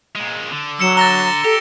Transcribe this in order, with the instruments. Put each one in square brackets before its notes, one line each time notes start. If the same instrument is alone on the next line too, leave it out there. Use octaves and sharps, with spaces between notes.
[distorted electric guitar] A#2 G#3
D3
[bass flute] F#3 [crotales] E6 C#7 E7
[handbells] A#5 [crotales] A6 A#6 G7
[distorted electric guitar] G4 [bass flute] A4